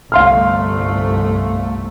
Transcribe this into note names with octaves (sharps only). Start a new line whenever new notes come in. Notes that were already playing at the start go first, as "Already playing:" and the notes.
G1 C2 A3 F5 C6 F6